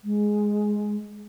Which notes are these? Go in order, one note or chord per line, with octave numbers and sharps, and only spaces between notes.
G#3